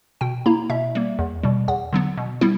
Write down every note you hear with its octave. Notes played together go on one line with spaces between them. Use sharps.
B2 G5
A#3 E4 A#5
B2 E5
G3 A#3
E2
B2 G3
E2 F#5
D3 F#3 B3
B2
G3 B3 E4